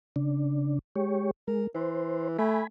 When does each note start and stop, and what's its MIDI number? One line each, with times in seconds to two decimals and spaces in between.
0.16 0.79 49
0.16 0.79 62
0.96 1.31 56
0.96 1.31 67
0.96 1.31 73
1.48 1.67 56
1.48 1.66 70
1.75 2.37 52
1.75 2.28 72
2.39 2.62 57
2.39 2.67 80
2.39 2.67 83